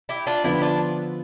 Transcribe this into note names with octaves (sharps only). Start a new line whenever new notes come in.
E4 G4
D4 F4
D3 F3 B3 E4 G4
D4 F4